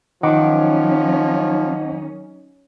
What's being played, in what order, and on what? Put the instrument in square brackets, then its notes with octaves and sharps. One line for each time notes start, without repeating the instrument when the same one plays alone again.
[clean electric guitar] D#3 [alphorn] F3 [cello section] F#3 C#4 D#4 [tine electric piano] D#5 F#5 D6